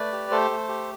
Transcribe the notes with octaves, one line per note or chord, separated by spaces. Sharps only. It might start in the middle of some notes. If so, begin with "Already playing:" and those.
Already playing: A3 B4 D5
G4
A3 A4 C5
A3
G4